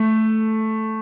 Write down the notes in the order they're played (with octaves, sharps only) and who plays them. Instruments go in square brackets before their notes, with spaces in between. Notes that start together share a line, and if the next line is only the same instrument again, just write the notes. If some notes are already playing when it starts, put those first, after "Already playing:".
Already playing: [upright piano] A3